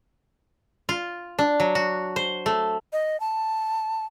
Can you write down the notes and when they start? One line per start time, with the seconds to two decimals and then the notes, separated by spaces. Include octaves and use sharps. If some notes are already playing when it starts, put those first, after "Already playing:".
0.89 F4
1.39 D4
1.60 F#3
1.75 F#4
2.16 C5
2.46 A3
2.93 D#5
3.20 A5